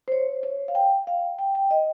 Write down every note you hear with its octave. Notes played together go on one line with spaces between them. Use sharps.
C5
C#5
C#5
F5
G5
F5
G5
G5
D#5